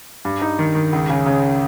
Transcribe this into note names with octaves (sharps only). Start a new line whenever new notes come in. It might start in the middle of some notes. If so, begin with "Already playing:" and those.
G2
D#4
D#3
D#3
C#2
C#3
C#3